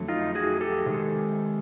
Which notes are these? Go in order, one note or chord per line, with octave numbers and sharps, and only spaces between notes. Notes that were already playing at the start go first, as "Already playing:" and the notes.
Already playing: F2 D3 F#3 A3
D#4 F4
F#4 G#4
G4 A4
C3 D#3 G#3